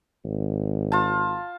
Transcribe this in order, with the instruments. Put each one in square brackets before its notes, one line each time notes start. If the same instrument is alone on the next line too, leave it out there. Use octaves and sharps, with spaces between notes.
[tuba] G#1
[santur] F4 A5